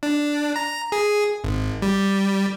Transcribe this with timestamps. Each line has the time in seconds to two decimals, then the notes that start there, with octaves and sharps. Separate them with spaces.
0.03 D4
0.56 A#5
0.92 G#4
1.44 G#1
1.82 G3